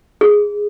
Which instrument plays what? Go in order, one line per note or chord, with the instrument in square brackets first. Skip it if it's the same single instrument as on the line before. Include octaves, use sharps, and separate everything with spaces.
[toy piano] G#4